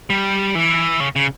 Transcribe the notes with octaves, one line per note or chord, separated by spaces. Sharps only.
G3
E3
C#3
C#3